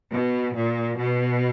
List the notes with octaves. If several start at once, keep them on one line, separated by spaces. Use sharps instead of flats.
B2
A#2
B2